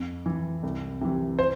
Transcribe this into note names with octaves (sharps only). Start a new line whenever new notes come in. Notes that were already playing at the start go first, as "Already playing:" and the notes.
Already playing: F2
E3
C2
C3 E3
C5